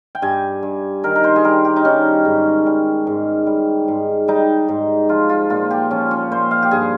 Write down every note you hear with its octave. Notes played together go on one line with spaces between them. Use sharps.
G5
G2 G#5
G2
D#3 A#4
A#4
C5
G#4
G3 A#4
G4
D#4
G3 C#4
G#2
G3
G#2
G3
G#2
G3 D#4
G#2
F3 F4
F4
A#2 F4
G4
F3 C#4
C#4
A#2 C5
F5
G4
G2 G#4